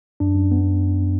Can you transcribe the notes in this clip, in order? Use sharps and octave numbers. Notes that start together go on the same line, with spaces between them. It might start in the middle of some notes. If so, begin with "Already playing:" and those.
F#2 D4
F#2
B3